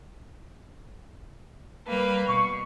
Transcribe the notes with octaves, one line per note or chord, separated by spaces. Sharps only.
G3 A#3 B4
B2 C#6